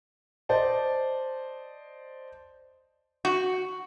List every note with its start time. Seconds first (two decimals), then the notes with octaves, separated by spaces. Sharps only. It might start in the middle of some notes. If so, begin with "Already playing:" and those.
0.49 C5 D5 D#5 A5
3.25 F#4